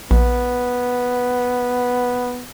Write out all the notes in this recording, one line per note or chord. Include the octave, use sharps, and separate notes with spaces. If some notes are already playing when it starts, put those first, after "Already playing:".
A#1 B3